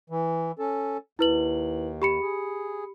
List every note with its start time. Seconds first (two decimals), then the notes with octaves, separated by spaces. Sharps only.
0.10 E3
0.59 C#4 A4
1.19 D#2 E4 B4 F#7
2.02 G4 B5 C#7
2.21 G#4